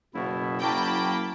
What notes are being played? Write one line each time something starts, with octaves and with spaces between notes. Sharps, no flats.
F#1 B2 E4
F#3 A#3 E4 G5 A5 B5 C#6 D6